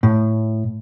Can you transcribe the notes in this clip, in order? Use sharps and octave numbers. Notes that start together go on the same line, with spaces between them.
A2